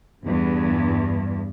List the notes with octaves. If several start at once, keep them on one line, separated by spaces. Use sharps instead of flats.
E2 G2